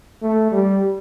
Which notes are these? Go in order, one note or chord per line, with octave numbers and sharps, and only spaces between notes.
A3
G3